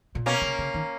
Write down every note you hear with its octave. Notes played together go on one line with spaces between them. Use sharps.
A#2
B2 A#3 C#4
C#3
C#3
D#3